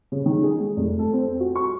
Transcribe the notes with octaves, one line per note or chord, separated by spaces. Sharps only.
C#3
D#3
G#4
G#3
F1
A4
C4
F#4
C#6